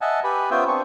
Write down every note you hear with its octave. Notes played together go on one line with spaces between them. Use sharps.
D#5 E5 F#5 G#5 A5
G4 B4 G#5 B5
B3 C#4 F4 C5 E5 G5
C4 D4 C#6